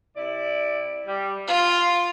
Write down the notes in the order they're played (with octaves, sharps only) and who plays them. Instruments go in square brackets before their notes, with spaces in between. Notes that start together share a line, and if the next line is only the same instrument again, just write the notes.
[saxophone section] C3 E4 D5
G3
[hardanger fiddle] F4 [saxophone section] F5